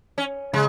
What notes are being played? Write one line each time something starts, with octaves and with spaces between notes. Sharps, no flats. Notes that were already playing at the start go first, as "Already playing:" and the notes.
C#4
C#3 G#3